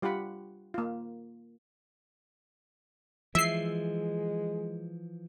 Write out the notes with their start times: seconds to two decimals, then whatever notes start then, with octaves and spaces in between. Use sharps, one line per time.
0.02 G3 F4 G4 F#5 B5
0.74 A#3 F4
3.35 E3 F3 G#3 E5 C7